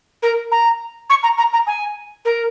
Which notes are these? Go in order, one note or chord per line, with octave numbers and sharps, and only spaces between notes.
A#4
A#5
C#6
A#5
A#5
A#5
G#5
A#4